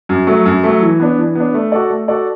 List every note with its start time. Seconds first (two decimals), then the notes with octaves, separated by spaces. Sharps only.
0.09 F#2
0.27 F#3 A3
0.46 F#2
0.63 F#3 A3
0.82 E3
1.00 B3 D4
1.18 E3
1.35 B3 D4
1.54 A3
1.72 F#4 A4 D5
1.90 A3
2.08 F#4 A4 D5